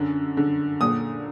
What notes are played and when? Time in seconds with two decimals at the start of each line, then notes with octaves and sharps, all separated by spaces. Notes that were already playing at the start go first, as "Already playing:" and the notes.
Already playing: F#2 D3
0.37 D3
0.81 A#2 D#6